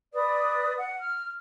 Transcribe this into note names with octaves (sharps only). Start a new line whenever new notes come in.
B4 D5 D#6
F#5
F6